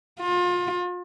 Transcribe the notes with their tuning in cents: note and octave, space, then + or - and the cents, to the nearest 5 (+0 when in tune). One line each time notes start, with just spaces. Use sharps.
F4 +30